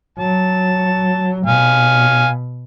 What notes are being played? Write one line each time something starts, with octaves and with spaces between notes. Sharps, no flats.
F#3 A5
B2 F5 G#5